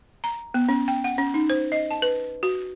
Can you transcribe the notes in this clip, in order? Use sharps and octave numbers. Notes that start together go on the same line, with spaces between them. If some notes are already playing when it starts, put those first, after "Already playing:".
A#5
B3
C#4
G5
F#5
C#4
D#4
C5
D#5
A5
B4
F#4